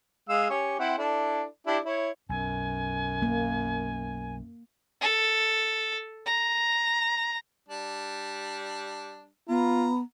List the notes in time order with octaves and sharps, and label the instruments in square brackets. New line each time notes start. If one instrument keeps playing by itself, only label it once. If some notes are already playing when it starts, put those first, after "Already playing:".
[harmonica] G#3 F5 E6
C#4 G4 C#5
C4 E4 F#5
D4 E4 A4
D4 E4 G4
E4 C#5
[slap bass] B1 [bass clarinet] F#2 [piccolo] G#5
[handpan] A#3
[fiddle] A4
A#5
[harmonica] G3 D4
[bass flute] B3 [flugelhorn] F4 [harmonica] A#5